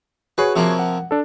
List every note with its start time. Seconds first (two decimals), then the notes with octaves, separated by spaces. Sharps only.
0.38 F#4 G#4 B4 C#5
0.56 C3 F3 A#3
0.79 F#5
1.11 D4 A4